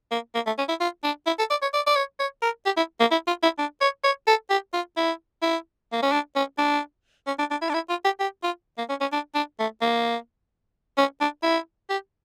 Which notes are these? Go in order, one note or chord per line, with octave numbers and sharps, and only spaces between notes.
A#3
A#3
A3
C#4
E4
F4
D4
E4
A4
D5
C#5
D5
D5
C#5
C#5
A#4
G4
E4
A#3
E4
F4
E4
D4
C#5
C#5
A4
G4
F4
E4
E4
A#3
C#4
D4
C#4
D4
C#4
D4
D4
E4
D4
E4
F4
G4
G4
F4
A#3
C#4
C#4
D4
D4
A3
A#3
C#4
D4
E4
G4